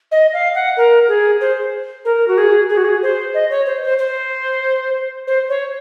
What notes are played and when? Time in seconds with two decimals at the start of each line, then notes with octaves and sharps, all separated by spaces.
0.11 D#5
0.33 F5
0.54 F#5
0.77 A#4
1.08 G#4
1.41 C5
2.05 A#4
2.28 F#4
2.37 G#4
2.69 G#4
2.77 F#4
2.84 G#4
3.02 C5
3.34 D#5
3.50 C#5
3.66 C5
3.82 C5
3.98 C5
5.27 C5
5.49 C#5